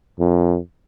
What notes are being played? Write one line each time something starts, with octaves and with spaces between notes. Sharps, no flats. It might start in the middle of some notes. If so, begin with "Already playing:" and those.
F2